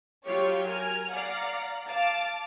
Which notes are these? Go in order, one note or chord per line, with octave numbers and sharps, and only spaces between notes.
F#3 F4 G4 C#5
A#4 G#5 F6
D5 F5 F#5 A#5
F5 A5 D6